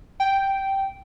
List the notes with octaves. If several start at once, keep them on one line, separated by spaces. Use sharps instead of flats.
G5